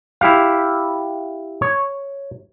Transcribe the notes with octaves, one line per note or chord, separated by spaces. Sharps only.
E4 G4 F5
C#5